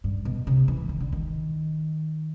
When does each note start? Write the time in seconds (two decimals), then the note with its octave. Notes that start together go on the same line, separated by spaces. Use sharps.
0.04 G2
0.25 B2
0.47 C3
0.68 E3
0.89 D#3
1.00 D3
1.12 D#3